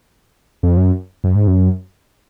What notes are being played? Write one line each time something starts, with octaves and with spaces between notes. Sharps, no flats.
F2
F#2
F#2
G#2
F#2